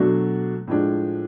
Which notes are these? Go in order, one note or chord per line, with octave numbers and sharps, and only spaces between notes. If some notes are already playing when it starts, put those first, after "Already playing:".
Already playing: B2 F#3 A3 D4 F#4
A2 F3 G#3 D4